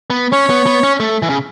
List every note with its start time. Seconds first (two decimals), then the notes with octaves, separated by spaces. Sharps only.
0.10 B3
0.32 C#4 C#5
0.49 B3
0.66 B3
0.83 C#4
1.00 A3
1.22 E3
1.30 C#3